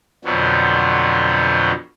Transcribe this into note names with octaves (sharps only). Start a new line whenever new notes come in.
F2 B2 D3 F3 F#3